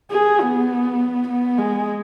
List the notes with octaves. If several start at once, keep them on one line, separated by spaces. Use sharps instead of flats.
G#4
B3
B3
G#3